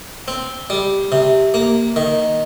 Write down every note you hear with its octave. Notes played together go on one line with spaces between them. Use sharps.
C4
G3
C3
A#3
D#3